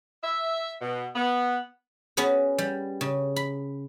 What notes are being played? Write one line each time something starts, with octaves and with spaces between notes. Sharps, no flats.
E5
B2
B3
B3 C#4 F#4 G#4 B4
G3
C#3
B5